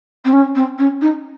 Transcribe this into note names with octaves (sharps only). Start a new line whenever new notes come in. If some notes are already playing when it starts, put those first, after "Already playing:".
C4
C#4
C4
C#4
D#4